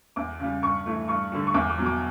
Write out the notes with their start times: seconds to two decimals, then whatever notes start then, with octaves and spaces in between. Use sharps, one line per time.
0.16 E2 D6
0.40 C#3 G3
0.62 G2 C#6
0.86 E3 A3
1.08 G2 C#6
1.32 D3 G3
1.47 C#6
1.54 E2 D6
1.70 D6
1.78 B2 F#3
1.86 D6